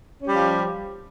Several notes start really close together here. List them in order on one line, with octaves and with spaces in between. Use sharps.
C#4 G4 G3 F3